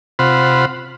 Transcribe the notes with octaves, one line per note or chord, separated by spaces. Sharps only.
C3 F4 C5 F#5 B5